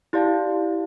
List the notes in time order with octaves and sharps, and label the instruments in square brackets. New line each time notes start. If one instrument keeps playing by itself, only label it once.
[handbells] E4 G4 D5 F5 A5